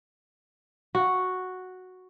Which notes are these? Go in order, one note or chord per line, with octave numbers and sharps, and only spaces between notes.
F#4